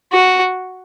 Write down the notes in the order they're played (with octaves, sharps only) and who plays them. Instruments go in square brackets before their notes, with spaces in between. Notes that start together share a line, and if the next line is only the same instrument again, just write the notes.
[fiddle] F#4